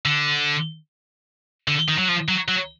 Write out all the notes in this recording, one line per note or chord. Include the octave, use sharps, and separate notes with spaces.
D3
D3
D#3
F#3
F3
F#3
F#3